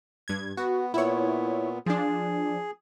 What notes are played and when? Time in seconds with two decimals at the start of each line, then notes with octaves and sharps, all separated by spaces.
0.28 G2 G#6
0.57 B3 F#4
0.94 A#2 B3 E4 C#5
1.86 F3 D4 G#4